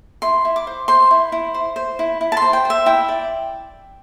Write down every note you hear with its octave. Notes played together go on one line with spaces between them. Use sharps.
E4 C6
E4
D6
C5
C5 C6
E4
E4
C5
C5
E4
E4
A5
C6
C5
G5
C5 E5
E4 G5
D5